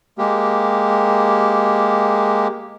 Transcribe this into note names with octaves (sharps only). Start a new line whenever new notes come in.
G#3 A#3 G4